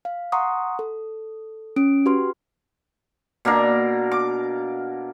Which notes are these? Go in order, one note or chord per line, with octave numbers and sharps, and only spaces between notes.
F5
F#5 A#5 C6 C#6 D#6
A4
C#4 D7
F#4 G4 B4 C6 F6
B2 A#3 D4 A#4
D6